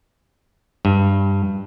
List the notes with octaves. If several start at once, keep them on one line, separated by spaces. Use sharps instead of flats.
G2